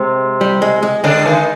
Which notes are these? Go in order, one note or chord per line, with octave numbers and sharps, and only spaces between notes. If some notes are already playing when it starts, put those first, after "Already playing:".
Already playing: C3 G#3 C4
G3
G#3
G#3
D3 G#3 D4
D#3 D#4